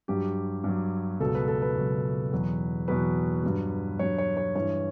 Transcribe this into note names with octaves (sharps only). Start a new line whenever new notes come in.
G2 F#3 G4
G2 F#3
C#2 B2 F#3 A4
B4
A4
B4
C#2 B2 F#3
E2 B2 F#3
E2 B2 F#3 B4
G2 F#3
G2 F#3 C#5
C#5
C#5
G2 E3 C#5